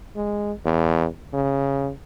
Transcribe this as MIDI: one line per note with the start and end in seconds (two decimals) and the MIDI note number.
0.16 0.53 56
0.65 1.06 40
1.34 1.90 49